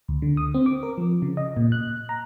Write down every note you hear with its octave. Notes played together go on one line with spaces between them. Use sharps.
D2
D3
D#6
C4
D6
A#4
F3
C#3
D#5
A#2
F#6
A#5